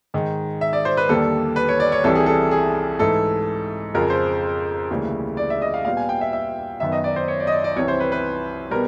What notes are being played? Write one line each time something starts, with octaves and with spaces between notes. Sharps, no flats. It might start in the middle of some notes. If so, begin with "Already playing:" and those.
G#2 D#3 G#3
E5
D5
C5
B4
D#2 D3 G3 A#3 A4
B4
C#5
D5
C#5
C2 C3 E3 G3 A4
G#4
A4
G#4
G#2 E3 A3 A4
F2 C#3 F3 G#3 A#4
C5
D2 C#3 E3 G3 A#3
D5
E5
D#5
F5
A#2 G3 B3 F5
G#5
G5
E5
E5
F#2 D#3 F#3 B3 E5
D#5
D5
C5
C#5
D5
D#5
D5
D5
C2 C3 E3 C#5
C5
B4
B4
B2 G3 B3 A#4